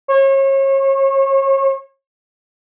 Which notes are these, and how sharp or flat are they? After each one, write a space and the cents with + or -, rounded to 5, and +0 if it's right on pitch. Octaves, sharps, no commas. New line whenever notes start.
C#5 -35